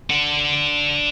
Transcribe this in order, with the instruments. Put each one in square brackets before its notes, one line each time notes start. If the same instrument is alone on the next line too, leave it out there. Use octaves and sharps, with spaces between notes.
[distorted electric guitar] D4 F#5